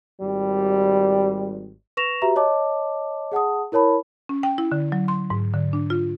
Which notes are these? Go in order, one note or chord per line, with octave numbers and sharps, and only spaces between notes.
G#1 G3
B4 C#6 A#6 E7 F7
F#4 G4 B4 E5 A#5
C#5 D#5 A5 D6
G#4 F#5 A5 D#6
E4 A#4 C#5 A5 B5
C#4
G5
E4
D3
F#3
C6
G#2
D3
D4
F4